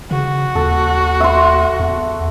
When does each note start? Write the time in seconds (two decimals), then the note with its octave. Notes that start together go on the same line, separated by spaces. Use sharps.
0.11 C#3 F#4
0.55 D#2 A4
1.20 E5 C6
1.80 E2